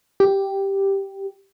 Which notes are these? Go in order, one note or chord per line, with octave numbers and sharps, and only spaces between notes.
G4